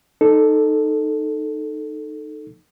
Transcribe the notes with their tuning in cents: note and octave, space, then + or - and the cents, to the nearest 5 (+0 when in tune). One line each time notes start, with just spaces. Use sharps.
D#4 -15 A4 +0